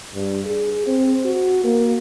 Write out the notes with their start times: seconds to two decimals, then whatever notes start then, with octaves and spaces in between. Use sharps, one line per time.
0.14 G2
0.46 G#4
0.87 C4
1.25 F#4
1.64 A#3